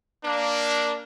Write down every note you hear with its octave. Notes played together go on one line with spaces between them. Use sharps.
A#3 D4